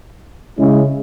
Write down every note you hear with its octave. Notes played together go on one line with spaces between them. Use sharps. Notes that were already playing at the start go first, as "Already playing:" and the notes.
C#3 G#3 C#4 E4